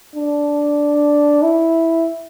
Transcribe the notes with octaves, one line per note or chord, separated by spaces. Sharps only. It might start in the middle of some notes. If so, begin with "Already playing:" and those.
D4
E4